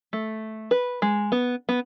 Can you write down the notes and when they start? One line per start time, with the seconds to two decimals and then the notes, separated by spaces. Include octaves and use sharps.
0.13 A3
0.71 B4
1.02 G#3
1.32 B3
1.69 B3